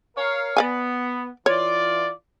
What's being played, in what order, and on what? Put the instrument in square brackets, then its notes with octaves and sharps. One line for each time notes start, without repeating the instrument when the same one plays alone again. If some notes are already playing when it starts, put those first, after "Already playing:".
[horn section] A#4 C#5 F5
[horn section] B3 [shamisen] D5 F5 G#5
[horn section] E3 F4 D5 [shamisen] C#5